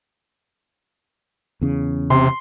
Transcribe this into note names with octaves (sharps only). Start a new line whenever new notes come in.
E2 C#3
C3 C6